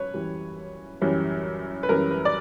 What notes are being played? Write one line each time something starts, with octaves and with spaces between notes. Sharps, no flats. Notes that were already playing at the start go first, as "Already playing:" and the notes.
Already playing: F#2 B4 C#5
F#2 E3 G3 C#4
F#2 E3 G3 C#4
B4
F#2 E3 G3 C#4 A#4
B4
D5